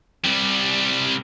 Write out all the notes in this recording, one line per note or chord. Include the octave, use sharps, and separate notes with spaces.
C2 G3